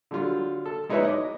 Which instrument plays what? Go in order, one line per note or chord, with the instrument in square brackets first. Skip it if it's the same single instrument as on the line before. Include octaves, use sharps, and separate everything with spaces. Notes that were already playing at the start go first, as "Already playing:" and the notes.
[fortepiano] D3 F#3 G3 F4
A4
G#3 D#4 E4 B4 C#5 E5
D#5 D6